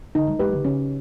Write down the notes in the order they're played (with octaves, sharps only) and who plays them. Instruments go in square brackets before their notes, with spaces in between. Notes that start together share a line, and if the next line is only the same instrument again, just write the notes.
[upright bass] D3 [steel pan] D#4
[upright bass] G3
[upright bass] G#3 [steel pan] G4 B4
[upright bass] C#3
D3
[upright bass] C#3 [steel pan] C#4